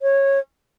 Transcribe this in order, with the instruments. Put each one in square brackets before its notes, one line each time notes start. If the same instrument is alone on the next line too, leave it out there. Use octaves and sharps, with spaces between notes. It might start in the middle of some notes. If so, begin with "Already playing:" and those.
[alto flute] C#5